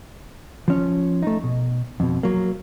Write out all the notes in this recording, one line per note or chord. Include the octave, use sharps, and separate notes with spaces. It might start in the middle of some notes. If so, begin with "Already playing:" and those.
F3 C#4 C#5
A3 D#4
B2
F2 B2
F#3 A#3